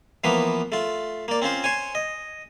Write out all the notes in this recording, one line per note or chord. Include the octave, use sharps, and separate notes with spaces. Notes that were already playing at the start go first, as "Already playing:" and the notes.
E3 F3 A#3 B3 B4
A3 F4
A#3 D5
C4 C#4 F4 C5
C5 C#5 G#5
D#5